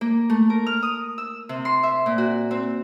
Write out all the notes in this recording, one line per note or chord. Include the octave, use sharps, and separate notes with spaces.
A#3
A3
A#4
F6
D#6
E6
C3
C6
E5
A#2
F#4
C4